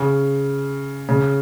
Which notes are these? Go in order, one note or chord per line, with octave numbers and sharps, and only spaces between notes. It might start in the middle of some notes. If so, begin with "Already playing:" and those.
Already playing: C#3
C#3